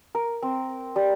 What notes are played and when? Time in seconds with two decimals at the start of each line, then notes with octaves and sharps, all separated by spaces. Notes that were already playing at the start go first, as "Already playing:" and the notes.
0.15 A#4
0.42 C4
0.96 G3